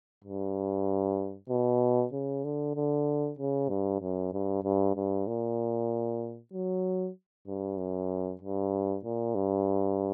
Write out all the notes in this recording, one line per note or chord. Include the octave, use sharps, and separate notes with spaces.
G2
B2
C#3
D3
D3
C#3
G2
F#2
G2
G2
G2
A#2
F#3
G2
F#2
G2
A#2
G2